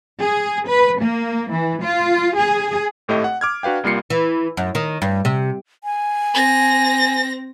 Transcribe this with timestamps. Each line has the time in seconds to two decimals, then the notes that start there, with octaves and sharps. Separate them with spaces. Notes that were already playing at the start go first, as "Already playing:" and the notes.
0.20 G#4
0.68 B4
1.00 A#3
1.51 E3
1.83 F4
2.37 G#4
3.08 G#1 A2 A3 G4 D#5 C#6
3.24 F#5
3.41 D6 F6 G#6
3.63 D4 F#4 B4 F5 G5
3.84 C2 G3 A#3 F4 C7 C#7
4.10 E3
4.57 F#2
4.75 D#3
5.02 G2
5.25 C3
5.84 G#5
6.33 C4 A#6